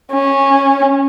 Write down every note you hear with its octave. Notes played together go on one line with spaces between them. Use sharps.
C#4